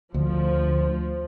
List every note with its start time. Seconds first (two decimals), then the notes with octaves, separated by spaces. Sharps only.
0.14 D2 F3